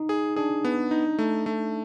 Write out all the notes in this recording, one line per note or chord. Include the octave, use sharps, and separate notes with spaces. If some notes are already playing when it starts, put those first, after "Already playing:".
Already playing: D#4
G#4
D4 G#4
B3
D#4
A3
A3